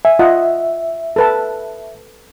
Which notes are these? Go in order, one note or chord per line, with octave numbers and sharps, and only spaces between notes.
E5 G#5
F4 D#5 F#5
A4 B4 A5